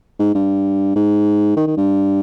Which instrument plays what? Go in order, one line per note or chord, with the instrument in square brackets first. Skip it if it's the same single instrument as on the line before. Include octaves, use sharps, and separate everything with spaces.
[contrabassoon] G#2
G2
G#2
D#3
D#3
G2